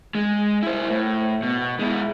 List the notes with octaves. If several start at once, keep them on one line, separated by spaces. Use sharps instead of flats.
G#3
E4 C5
A2
B2
G#3 E4